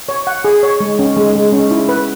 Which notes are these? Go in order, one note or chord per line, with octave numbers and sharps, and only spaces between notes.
C#5
F#5
G#4
C#5
G#3
C#4
G#3
G#3
C#4
E4
B4